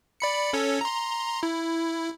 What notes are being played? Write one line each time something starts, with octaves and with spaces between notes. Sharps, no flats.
D5 B5 C#7
C#4 A4 C#5
A#5 C6
E4